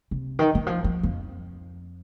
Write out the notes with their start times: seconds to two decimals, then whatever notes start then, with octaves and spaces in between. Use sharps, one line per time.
0.11 C3
0.39 D#3
0.55 D#3
0.67 F3
0.84 F3
1.03 F2